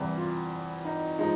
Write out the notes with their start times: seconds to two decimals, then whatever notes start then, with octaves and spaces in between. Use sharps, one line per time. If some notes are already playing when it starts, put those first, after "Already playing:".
Already playing: E2 C3 E3 G3 E4
0.17 F4
0.85 D#4
1.19 F3 G#3 D#4